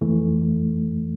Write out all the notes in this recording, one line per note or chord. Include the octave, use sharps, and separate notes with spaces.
F2 E3 A3